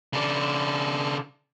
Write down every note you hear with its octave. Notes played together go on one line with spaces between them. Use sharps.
C#3 D4